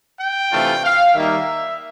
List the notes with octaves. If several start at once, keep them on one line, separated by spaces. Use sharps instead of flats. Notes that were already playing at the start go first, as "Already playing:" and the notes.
G5
C3 E3 A3 D4 F4
F5
D#3 G3 A#3 D#4 E5